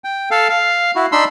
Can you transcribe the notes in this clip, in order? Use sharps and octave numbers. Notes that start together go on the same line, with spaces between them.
G5
A4 F5
F5
E4 F#4
D4 D#4 B5 C6 E6